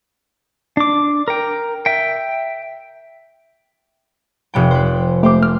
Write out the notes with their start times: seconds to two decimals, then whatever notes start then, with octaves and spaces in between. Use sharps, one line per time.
0.77 D4 D6
1.28 A#4 G5
1.86 E5 G5
4.54 F1 B3 G5
4.71 B4 C5
5.23 A3 G4 C5 D6
5.41 A3 F6